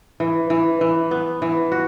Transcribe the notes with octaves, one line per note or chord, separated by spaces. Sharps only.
E3
E3
E3
B3
E3
F#4